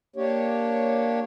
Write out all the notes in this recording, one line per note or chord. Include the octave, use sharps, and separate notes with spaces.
A#3 D4 G4 C#5